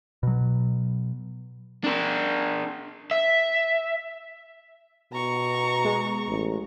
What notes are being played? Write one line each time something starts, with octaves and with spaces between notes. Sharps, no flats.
B2 F#3
D4 A#4
E5
B2 A#5 C#6
G#3
A1